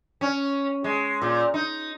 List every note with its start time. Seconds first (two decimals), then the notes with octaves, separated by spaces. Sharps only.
0.21 C#4
0.84 G#3
1.22 A#2
1.54 D#4